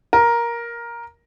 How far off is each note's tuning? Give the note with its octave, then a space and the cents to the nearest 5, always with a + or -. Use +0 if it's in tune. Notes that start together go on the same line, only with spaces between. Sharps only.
A#4 +10